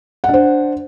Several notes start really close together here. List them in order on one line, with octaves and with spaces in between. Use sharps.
F#5 D4 C5